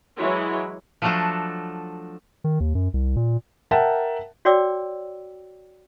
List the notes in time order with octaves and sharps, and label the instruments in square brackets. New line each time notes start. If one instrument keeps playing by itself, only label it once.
[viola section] E3 F#3 G#3 E4 C#5
[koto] F3 F#3 A3 D4 F#4 A4
[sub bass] D#3
D#2
F#2
C2
A#2
[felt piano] A#4 E5 F#5 G5 A5
[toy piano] F#4 C#5 D5 G5 D6 E6